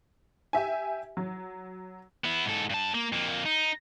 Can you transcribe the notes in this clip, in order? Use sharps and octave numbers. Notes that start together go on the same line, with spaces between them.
G4 E5 G#5
F#3
B3 E4
G#2 A4
G2 A5
A#3
F2 A#3
D#4